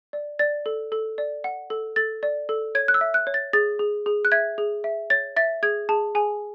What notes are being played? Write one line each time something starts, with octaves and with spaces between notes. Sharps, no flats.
D5
D5 A6
A4
A4
D5
F#5
A4
A4 A6
D5
A4
C#5 G#6
F#6
E6
E5
F#6
C#5
A6
G#4 A6
G#4
G#4
F#6
E5 G#6
G#4
E5
C#5 A6
E5 A6
G#4 G#6
G#4 A5
G#4 G#5